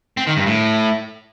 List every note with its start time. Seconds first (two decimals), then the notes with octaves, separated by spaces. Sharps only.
0.17 C4
0.27 D#3
0.37 G2
0.47 A2